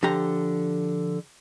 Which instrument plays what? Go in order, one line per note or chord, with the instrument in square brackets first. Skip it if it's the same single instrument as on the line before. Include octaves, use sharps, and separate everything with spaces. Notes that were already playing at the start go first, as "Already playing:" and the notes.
[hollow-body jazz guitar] D3 F3 G4 A#5